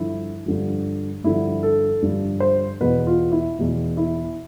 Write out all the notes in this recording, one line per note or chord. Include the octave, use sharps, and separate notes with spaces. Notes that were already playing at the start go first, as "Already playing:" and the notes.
Already playing: G2 D3 F3 E4
G2 D3 F3
G2 D3 F3 E4
A4
G2 D3 F3
C5
E2 B2 B4
F4
E4
E2 B2
E4